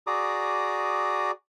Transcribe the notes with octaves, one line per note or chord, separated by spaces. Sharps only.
F#4 G#4 D5 A#5 D6 D#6